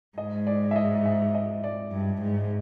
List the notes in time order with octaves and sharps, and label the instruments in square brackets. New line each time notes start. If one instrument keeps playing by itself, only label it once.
[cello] G#2 [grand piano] D#5
[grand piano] D5
E5
D#5
E5
D#5
D5
[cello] G2
G#2